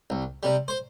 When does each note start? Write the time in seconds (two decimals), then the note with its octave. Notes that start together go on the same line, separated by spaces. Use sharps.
0.10 C2
0.43 C3 G3
0.68 C5